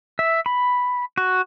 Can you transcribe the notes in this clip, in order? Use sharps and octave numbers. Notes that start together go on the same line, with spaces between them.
E5
B5
F#4